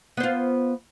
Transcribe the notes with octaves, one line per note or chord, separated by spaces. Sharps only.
B3 F4 C5